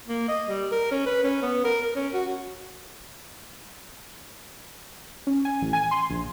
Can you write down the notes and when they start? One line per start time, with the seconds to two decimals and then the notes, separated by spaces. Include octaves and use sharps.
0.08 A#3
0.29 D#5
0.48 G3
0.72 A#4
0.91 C#4
1.06 B4
1.24 C#4
1.42 B3
1.64 A#4
1.82 A#4
1.96 C#4
2.14 F#4
5.27 C#4
5.45 G#5
5.61 A1
5.73 G#5
5.91 C6
6.10 A#1